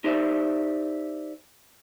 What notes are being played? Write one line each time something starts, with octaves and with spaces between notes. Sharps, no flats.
D#4 G4 C5 D5 E5